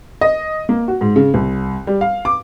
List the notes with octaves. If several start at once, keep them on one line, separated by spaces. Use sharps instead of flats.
D#5
A#3
F#4
G#2
C#3
C2
G3
F5
D6